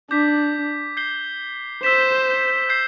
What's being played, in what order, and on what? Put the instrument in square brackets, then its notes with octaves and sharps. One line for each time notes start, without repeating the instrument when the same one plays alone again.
[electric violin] D4 [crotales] D6 G6 B6
[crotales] G6 C7 G7
[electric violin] C5 [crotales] E6 B6 E7
[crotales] E6 G6 C7